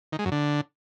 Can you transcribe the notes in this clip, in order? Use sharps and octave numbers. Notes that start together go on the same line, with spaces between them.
D#3
G#3
F#2
D3